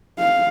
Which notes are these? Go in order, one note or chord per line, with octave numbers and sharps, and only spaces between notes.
F5